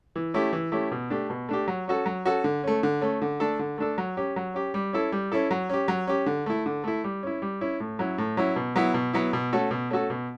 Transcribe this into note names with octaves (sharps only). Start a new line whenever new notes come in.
E3
A3 C#4 E4 G4
E3
A3 C#4 E4 G4
B2
A3 D4 G4
B2
A3 D4 G4
F#3
C#4 F#4 A4
F#3
C#4 F#4 A4
D3
A3 C#4
D3
A3 C#4
D3
A3 D4 A4
D3
A3 D4 A4
F#3
C#4 G4
F#3
C#4 G4
G3
C#4 E4 A4
G3
C#4 E4 A4
F#3
C#4 G4
F#3
C#4 G4
D3
A3 E4
D3
A3 E4
G3
C#4 E4
G3
C#4 E4
A2
F#3 C#4 E4
A2
F#3 C#4 E4
B2
F#3 B3 E4
B2
F#3 B3 E4
B2
A3 C#4 F#4 A4
B2
A3 C#4 F#4 A4
B2